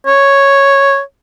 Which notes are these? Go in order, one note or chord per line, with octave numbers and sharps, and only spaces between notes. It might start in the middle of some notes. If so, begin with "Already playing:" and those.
C#5